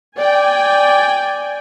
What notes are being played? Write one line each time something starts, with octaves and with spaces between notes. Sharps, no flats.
D5 G5 G#5